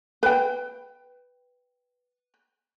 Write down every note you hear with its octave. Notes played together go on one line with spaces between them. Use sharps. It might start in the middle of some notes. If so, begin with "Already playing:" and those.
B4 G5